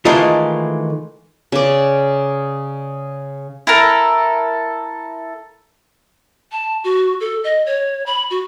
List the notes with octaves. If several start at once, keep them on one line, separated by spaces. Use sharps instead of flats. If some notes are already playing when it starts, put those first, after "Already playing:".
D#3 E3 G#3 A3 F4
C#3 D5
E4 A4 A#4
A5
F#4
A4
D#5
C#5
B5
F#4